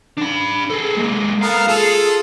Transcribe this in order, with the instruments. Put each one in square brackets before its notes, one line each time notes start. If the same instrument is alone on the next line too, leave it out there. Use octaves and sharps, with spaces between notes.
[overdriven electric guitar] D4 B5
G#4 A4
G#3 A#3
[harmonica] B3 A4 A#4 [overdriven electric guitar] F5
[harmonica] F4 A4 [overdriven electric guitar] G#4